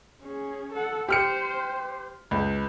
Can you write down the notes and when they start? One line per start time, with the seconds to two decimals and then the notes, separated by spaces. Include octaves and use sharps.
0.21 C#4 G#4
0.73 A4 F#5
1.09 G4 C5 F6 C#7
2.31 C#2 B4